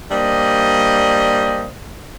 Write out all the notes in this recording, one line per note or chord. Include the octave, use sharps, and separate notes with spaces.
G3 A#3 D4 C5 D#5